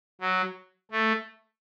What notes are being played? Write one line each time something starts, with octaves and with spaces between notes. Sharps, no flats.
F#3
A3